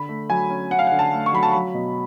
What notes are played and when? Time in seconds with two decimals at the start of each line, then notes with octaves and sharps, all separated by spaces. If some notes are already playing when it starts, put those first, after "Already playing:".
Already playing: D3 B5
0.09 A3
0.30 F#3 G#5
0.50 C#4
0.71 C#4 F#5
0.79 F5
0.87 F#5
0.92 D3
0.99 A5
1.12 A3
1.26 C#6
1.33 F#3 B5
1.43 A5
1.51 F#3 B5
1.74 B2